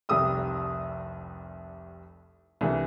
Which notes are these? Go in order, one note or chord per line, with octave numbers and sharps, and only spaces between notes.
F1 C2 G3 G4 D#6 E6
C2 D3 E3 G3